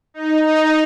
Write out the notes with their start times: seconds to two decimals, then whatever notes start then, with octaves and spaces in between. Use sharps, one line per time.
0.14 D#4
0.47 D#4